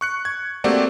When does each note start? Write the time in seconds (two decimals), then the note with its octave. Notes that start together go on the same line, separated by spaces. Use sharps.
0.01 C#6 F#6 C#7
0.25 G#6
0.64 A3 A#3 C4 F#4 G4 D5